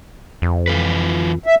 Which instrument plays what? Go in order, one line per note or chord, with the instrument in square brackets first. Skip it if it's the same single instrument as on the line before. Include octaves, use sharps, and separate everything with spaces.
[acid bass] F2
[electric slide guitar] E3 F4 B4
[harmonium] E5